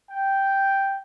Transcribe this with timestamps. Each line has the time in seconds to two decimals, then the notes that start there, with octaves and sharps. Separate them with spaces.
0.11 G5